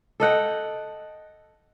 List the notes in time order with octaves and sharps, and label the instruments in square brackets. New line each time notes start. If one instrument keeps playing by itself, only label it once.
[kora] A4 D#5 F#5 G5